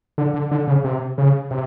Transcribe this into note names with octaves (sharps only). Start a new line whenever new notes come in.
D3
D3
D3
C#3
C3
C#3
C3